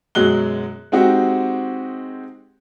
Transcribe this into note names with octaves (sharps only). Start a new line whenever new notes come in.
F#2 B2 F#3 G#3 F#6 G7
G#3 C4 D#4 F#4 G4